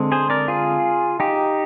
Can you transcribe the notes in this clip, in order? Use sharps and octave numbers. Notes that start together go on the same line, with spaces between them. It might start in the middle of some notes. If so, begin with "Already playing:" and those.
Already playing: D3 G#3 C4
G#4 C5
A#4 D5
F4 G#4
D#4 G4